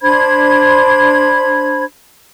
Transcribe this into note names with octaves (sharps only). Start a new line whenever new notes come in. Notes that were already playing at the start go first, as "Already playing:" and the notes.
D4 C5 B5 G#6